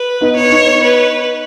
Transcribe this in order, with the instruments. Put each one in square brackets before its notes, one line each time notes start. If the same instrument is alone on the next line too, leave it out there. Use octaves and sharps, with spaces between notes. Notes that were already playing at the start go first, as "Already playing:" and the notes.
Already playing: [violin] B4
[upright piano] B3 D#4
[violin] C#5
[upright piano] B3 D#4
[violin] B4